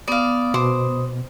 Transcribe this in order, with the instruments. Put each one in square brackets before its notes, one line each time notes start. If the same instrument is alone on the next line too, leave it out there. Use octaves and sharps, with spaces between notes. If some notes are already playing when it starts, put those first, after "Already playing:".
[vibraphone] B3 D#6 [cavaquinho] D5 F5
[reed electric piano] B2 [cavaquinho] C5 D6